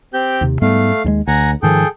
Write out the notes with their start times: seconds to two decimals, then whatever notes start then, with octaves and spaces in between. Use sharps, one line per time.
0.14 C4 G4 G6
0.41 D#2 C3
0.62 G#2 G3 A3 B3 F5
1.04 D#2 G3 G#3
1.27 D2 F#5 G#5 A#5
1.63 G#2 D#3 F3 G#4 A4 G5